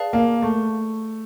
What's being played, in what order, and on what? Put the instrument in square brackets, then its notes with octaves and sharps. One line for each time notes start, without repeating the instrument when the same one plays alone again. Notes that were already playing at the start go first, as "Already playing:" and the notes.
Already playing: [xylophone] G#4 B4 D5 F5 A5
[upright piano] A#3
A3